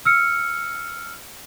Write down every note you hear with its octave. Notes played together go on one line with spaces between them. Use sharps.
E6 F6 C#7